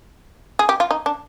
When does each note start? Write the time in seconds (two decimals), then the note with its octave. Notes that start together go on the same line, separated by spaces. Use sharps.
0.59 G#4
0.69 G4
0.80 F4
0.91 D#4
1.06 D4